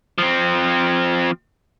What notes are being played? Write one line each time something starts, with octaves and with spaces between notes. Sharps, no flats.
F3 C4